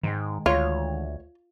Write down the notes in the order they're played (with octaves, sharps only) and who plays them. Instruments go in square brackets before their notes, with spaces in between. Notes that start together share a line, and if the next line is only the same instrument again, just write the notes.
[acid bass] G#2 [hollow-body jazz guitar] D#3 G#3 G5
[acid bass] D2 [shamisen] F4 [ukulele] C#5